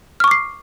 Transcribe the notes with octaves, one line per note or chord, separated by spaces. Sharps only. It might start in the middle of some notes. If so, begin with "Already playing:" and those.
C#6 D6 F6 C7